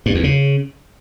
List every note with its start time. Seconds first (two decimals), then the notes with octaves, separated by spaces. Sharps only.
0.06 G2
0.15 E2
0.24 C#3